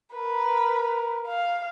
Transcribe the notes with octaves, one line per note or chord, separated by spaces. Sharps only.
A#4 B4
F5